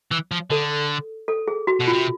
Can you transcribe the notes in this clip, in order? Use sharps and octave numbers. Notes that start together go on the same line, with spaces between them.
E3
F3
D3 A4
A4
G#4
F#4
B2
F4
C3